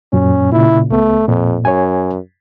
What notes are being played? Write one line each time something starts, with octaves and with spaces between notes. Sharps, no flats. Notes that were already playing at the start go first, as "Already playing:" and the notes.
F#2 A#2 C#4
A#2 C#3 E4
C#2 A3 B3
F2 A#2
F#2 C#5 G#5